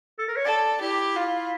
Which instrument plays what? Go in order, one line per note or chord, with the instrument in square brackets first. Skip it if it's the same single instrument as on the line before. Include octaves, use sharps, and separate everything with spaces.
[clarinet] A4
A#4
C#5
[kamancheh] A4 [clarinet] D5
[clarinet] E4 [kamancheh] G4
[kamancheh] F4